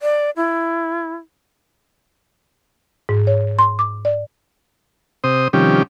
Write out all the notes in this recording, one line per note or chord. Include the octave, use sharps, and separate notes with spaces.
D5
E4
G#2
C#5
C6
D6
D5
C3 C5 D#6
C3 D#3 F3 G3 C#4 G4